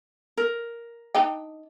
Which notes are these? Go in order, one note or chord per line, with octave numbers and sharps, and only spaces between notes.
A#4
D4 D#4 G5